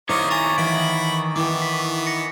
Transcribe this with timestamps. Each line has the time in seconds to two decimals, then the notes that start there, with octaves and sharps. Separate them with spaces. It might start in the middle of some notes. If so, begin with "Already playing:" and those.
0.09 D#3 E4 A#4 C5 C#5 D#5 D6
0.30 G#5 A#5 C#6 A6
0.58 E3 E4 F#5 B5 D7
1.36 E3 B3 E4 G5 D6
1.62 B6
2.07 A#6 C#7